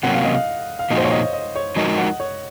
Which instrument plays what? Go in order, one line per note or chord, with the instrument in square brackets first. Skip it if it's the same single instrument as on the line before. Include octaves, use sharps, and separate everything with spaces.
[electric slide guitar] C3 F#3 A#3 C#4 [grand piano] F#5
[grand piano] F5
D#5
F5
F5
[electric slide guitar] A#2 F3 A#3 D#4 F#4 [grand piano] D#5
[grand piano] C5
C#5
D#5
D#5
C#5
[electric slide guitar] F3 G#3 D#4 F#4 A#4 [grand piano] D#5
[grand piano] F#5
C#5